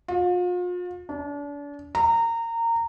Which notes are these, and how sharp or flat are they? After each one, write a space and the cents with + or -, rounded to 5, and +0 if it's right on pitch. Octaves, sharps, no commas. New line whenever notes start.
F4 +40
D4 -35
A#5 -20